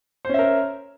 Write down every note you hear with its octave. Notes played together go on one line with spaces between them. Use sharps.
C#4 A#4 C5 E5